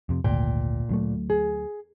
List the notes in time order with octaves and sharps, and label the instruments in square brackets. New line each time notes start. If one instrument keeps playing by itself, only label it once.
[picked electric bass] F2 C3
[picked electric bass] G#1 D2 [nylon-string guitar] A#2 G5
[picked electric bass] D2 F#3 A3
[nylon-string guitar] G#4